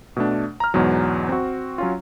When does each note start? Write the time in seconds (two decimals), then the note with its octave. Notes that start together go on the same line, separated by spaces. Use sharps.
0.17 B2 A3 D4
0.60 A#5 F6
0.74 E2 G#2 B2 F#3
1.29 C4 F#4
1.78 F#3 C#4 F4